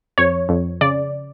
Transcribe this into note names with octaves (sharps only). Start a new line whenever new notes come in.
F2 C#5
F2
C#3 D5